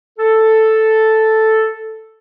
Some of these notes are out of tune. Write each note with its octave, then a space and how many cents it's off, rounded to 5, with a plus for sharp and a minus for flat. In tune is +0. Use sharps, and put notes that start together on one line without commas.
A4 +0